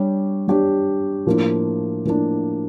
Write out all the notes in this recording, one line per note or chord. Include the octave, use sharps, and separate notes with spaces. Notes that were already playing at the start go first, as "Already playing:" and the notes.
Already playing: G3 D4 G4 C#5
G3 D4 G4 C#5
A2 F3 A#3 D4
A2 F3 A#3 D4